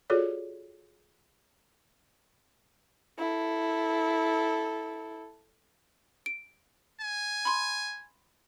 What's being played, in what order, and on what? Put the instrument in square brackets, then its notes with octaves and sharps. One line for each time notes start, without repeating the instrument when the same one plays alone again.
[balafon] F4 F#4 G#4 A4 C#5 D5
[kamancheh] E4 A4
[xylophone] D7
[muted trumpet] G#5
[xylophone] B5 C6